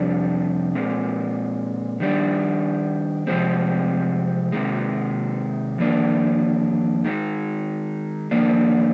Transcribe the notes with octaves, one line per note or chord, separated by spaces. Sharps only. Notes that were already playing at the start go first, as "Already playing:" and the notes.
Already playing: F2 C3 G3 D4
A#2 G#3 C4
D#3 G3 D4
C3 F3 G#3 C4
C3 D#3 G#3
F2 D#3 A#3 D4
D#3 G#3 D#4
F2 D#3 A#3 D4